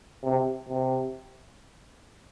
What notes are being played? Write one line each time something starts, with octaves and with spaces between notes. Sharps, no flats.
C3
C3